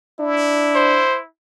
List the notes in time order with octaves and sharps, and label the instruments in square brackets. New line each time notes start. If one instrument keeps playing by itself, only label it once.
[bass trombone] D4 [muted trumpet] E4
[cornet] C5